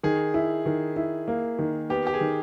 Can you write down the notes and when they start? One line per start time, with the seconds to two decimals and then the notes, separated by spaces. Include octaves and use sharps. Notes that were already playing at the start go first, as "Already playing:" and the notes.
0.03 D#3 G#4
0.34 E4
0.66 D#3
0.96 E4
1.28 A#3
1.59 D#3
1.90 B3 G4
2.07 G4
2.14 G#4
2.21 D#3